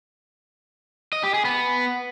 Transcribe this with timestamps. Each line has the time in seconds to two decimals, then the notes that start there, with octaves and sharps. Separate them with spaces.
1.13 D#5
1.23 G4
1.34 G#4
1.45 B3